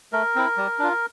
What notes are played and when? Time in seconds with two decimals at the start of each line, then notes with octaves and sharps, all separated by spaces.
0.13 A3 A#4
0.36 C4 E4
0.57 G3
0.79 D4 F4